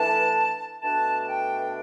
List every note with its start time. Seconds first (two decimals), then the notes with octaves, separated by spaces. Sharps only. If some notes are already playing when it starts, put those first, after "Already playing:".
Already playing: E3 A3 D4 A5
0.82 B2 A3 D4 A5
1.21 A5
1.28 G5